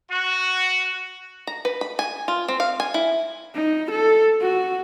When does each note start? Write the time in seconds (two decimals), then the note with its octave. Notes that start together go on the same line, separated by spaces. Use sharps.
0.11 F#4
1.47 A#5
1.65 B4
1.81 B5
1.99 G#5
2.28 F4
2.48 C4
2.60 F5
2.80 G#5
2.94 E4
3.56 D#4
3.92 A4
4.41 F#4